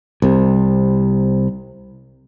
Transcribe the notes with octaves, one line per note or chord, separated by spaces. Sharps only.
C2 C3